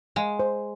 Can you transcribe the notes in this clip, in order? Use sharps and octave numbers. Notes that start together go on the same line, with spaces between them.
G#3 F5
C5